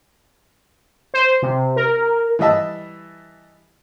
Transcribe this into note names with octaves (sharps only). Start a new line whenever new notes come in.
C5
C3
A#4
E3 G3 D#5 E5 A5